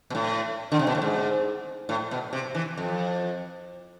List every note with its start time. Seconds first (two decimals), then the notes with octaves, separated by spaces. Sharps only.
0.10 B2
0.15 A2
0.72 D3
0.79 C3
0.87 B2
0.95 A2
1.02 G#2
1.89 A2
2.11 B2
2.33 C3
2.55 E3
2.77 F2